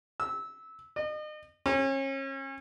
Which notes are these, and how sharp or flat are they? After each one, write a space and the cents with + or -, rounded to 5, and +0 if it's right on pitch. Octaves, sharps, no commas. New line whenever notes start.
E6 -20
D#5 -35
C#4 -35